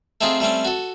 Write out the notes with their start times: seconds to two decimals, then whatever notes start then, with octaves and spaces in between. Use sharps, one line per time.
0.21 A3 C4 D#4 F4 G#4
0.40 G3 A3 C4 C#4
0.65 F#4 A4